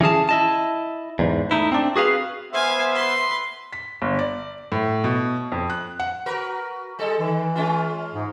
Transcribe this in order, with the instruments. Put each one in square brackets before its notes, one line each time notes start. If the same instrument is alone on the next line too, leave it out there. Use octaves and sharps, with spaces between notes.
[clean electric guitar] E3 C#4 G#4 A5
E4 D#5 A5
E2 G#2
A3 D#4 E4
C4 D4
F#4 G#4 B4 F5
[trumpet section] B3 C5 E5 [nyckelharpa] F5 G#5
[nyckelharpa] B4 C6
[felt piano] B6
G1
D5
A2
B2
F2
F#6
F#5
[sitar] F#4 A#4 B4
G3 G#3 A4
[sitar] D#3 [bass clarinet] E3
[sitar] G#3 C#4 F4
[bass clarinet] G#2